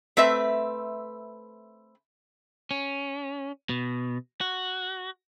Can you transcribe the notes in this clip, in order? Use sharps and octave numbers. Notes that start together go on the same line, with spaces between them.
A3 C4 B4 E5
C#4
B2
F#4